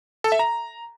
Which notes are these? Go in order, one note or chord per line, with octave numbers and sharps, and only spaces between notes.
A4
E5
A#5